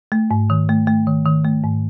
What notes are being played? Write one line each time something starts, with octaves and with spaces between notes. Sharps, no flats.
A3
G#2
D#3
A3
A3
D#3
D#3
A3
G#2